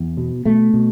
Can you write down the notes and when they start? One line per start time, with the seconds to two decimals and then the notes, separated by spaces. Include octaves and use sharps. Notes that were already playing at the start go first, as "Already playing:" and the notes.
Already playing: E2
0.17 B2
0.45 B2 A3
0.74 B2